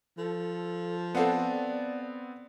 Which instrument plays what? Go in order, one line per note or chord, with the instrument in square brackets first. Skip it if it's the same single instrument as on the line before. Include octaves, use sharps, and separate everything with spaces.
[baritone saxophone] F3 [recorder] A4
[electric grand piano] B3 C4 [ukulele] A4 F5 F#5 [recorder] D5